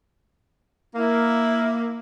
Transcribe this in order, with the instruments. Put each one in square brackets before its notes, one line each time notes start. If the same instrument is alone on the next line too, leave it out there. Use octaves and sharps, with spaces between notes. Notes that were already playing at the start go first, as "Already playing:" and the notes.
[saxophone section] A#3 [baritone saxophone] E4